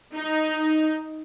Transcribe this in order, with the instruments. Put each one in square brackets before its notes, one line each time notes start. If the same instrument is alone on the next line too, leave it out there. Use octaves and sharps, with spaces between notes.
[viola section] D#4